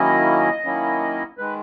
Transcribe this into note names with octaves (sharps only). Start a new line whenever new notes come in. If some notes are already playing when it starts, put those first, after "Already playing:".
Already playing: D#3 F#3 A#3 C#4 E4 D#5
D#3 F#3 A#3 C#4 E4
D#3 G#3 B4